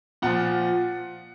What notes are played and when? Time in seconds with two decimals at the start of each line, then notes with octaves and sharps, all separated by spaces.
0.22 A#2 F3 F#5